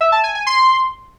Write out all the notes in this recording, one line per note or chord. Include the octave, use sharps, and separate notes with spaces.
E5
A5
G#5
G#5
C6